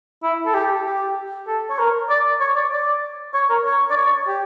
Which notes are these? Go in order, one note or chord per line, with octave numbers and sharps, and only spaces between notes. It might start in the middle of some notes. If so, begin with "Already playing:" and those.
E4
A4
G4
G4
A4
C#5
A#4
D5
C#5
D5
D5
C#5
A#4
C#5
D5
C#5
G4